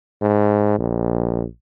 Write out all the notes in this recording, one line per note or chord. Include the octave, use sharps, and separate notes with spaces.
G#2
A#1